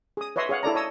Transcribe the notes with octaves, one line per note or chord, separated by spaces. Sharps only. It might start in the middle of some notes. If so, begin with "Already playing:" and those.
G#4 D#6
B4 C#5 D#5 E5 C6
G#4 C#5 F5 F#5
E4 A4 D5 A#5
C#5 D#5 A5 D#6 E6